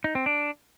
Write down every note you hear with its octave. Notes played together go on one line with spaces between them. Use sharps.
D#4
C4
D4